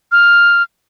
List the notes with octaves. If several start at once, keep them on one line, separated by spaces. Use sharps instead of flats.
F6